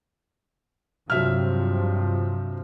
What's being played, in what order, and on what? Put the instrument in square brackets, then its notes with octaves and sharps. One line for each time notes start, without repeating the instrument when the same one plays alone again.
[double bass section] G2 C3 F3 [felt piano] F#3 E5 F6